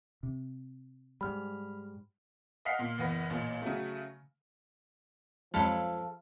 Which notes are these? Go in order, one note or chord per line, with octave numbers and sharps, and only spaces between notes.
C3
G#2 G3 B5 F6
D#5 F5 F#5 F6 B6 C7
A#2
F#1 E3 B3 A#6
A1 A#2
C#3 F#3 A3
F2 F3 F#3 G#3 A4 F5 B5